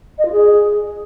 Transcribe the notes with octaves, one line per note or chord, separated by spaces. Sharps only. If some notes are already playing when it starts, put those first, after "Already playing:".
D#5
F4
G#4